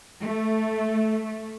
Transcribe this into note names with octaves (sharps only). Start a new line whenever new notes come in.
A3